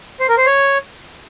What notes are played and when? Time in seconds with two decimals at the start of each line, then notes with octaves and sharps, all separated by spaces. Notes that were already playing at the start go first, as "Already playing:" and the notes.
0.20 C5
0.29 A#4
0.37 C5
0.46 C#5